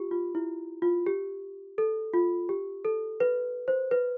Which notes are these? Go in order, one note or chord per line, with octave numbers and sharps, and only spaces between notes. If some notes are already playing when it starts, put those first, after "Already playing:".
Already playing: F4 G4
F4
E4
F4
G4
A4
F4
G4
A4
B4
C5
B4